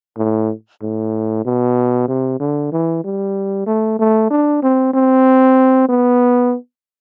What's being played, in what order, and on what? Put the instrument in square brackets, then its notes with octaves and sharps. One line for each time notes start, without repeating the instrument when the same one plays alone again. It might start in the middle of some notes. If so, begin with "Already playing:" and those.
[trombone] A2
A2
B2
C3
D3
E3
G3
A3
A3
D4
C4
C4
B3